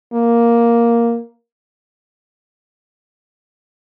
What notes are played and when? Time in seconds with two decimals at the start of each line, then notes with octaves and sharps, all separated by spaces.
0.14 A#3